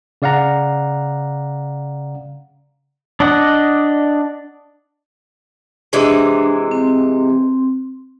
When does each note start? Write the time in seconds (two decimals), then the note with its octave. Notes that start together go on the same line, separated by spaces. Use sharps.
0.22 C#3 D5 F5 F#5 A#5
3.20 D4 D5 D#5 F#5
5.93 C3 E3 G#3 D4
6.71 C4 C6